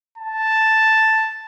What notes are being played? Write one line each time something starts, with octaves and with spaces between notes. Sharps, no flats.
A5